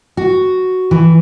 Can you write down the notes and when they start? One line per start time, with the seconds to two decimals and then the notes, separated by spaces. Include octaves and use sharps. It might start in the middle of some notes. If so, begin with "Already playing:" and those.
0.17 F#4
0.91 E3